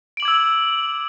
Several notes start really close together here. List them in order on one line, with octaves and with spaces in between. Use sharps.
D7 F#7 D6 G#6 E6